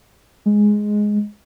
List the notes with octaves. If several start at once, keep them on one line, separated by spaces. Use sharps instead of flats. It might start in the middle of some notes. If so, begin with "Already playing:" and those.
G#3